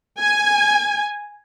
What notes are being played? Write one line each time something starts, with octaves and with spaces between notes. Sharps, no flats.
G#5